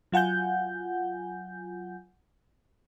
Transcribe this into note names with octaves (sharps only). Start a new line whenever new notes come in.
F#3 F4 F#5 G#5 G6